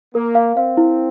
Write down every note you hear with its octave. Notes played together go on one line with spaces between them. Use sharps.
A#3 A#4
F5
C4 F5
E4